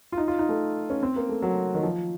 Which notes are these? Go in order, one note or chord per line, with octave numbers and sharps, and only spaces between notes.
F4
D#4
F4
D#4
A3
C#4
C4
A#3
A3
F#3
D#3
F3